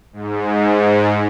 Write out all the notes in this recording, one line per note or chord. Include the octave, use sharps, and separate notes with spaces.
G#2